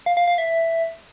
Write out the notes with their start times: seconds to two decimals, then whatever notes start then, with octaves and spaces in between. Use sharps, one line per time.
0.06 F5
0.17 F5
0.28 F5
0.38 E5